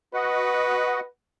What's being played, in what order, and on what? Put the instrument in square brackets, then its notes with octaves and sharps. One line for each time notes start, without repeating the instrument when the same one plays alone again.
[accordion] F#4 D#5 F#5 [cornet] B4